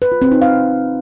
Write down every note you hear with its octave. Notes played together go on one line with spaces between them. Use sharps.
B4
F4
C4
D#4
F5